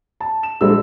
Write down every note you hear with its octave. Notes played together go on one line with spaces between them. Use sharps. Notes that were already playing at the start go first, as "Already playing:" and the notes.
A5
E7
A#1 G3 G#3 A4 E6